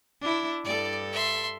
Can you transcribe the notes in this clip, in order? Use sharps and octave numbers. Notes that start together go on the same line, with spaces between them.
D4 E4
G2 A4 D5
E5 C6